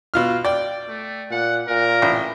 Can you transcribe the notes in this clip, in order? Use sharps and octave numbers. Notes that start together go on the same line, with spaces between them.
B2 F4 F6
D5 G5
A3
A#2 F#5
A#2 A#4
A1